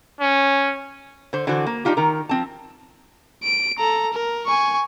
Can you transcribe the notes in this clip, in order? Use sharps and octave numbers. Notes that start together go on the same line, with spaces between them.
C#4
D3 C5
D3 E3 D4 F#4 C5
A#3
G3 D4 D#4 F4 G4
D#3 A#4
F3 C4 A5
D7
A4 A#5
A#4
G#5 C#6